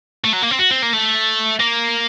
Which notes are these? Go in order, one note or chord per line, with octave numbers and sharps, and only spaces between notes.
A3
F#3
A#3
C4
F#4
C4
A#3
A3
A#3